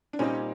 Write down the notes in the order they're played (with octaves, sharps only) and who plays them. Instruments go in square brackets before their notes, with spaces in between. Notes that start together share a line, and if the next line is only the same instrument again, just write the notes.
[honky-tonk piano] D4
[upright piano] A#2 G3 C4 D#4 [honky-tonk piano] C#4